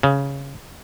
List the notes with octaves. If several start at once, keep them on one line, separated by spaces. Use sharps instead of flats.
C#3